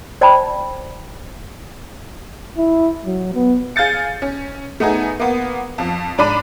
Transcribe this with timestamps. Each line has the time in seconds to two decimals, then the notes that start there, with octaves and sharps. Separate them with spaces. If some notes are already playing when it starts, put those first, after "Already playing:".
0.21 C5 D5 G5 A5 B5
2.58 E4
3.06 F#3
3.35 B3
3.76 G#4 F5 G6 A6 C#7
4.22 C#4
4.80 A3 B3 D#4 G#4
5.20 A#3 B3
5.78 F2 F3
6.18 G#2 D4 D5 B5 D#7